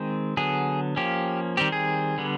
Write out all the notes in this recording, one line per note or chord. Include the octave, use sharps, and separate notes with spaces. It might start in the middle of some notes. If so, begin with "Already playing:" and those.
Already playing: D#3 G#3 C4
D3 F#3 B3 G#4
F3 A#3 C#4 G4
D#3 G3 C4 G4
G#4
D3 G3 B3